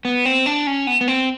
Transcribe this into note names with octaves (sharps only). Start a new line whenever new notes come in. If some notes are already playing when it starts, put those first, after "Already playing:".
B3
C4
D4
C#4
B3
B3
C4